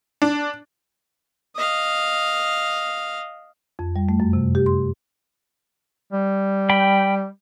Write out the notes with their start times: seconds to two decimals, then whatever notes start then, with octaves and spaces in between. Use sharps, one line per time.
0.22 D4
1.55 D#5 F5
3.79 F2
3.96 G3
4.09 A3
4.20 F#2
4.33 C3
4.55 G4
4.66 C6
6.13 G3
6.70 G5 B5